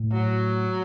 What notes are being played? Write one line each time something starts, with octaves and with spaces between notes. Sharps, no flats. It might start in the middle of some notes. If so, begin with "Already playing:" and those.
Already playing: A2
F#3